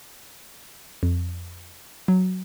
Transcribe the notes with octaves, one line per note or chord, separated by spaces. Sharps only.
F2
F#3